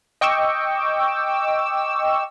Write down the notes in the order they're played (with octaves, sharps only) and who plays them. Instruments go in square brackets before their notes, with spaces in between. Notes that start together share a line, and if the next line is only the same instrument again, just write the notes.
[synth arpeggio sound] D#5 G5 C#6 D6 E6